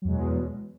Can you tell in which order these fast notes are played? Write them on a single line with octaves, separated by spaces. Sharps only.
F#3 E2 G#3 B2